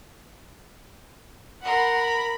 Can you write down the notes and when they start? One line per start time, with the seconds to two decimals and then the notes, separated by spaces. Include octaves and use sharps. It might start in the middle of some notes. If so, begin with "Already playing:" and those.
1.64 A#4 F#5 B5 C6
1.95 B5